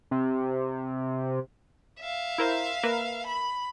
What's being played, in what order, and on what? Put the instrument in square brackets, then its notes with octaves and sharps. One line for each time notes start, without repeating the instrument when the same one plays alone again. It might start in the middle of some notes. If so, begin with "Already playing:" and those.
[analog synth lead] C3
[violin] E5 F5
[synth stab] E4 A#4 C5
A#3 A#4 B4
[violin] B5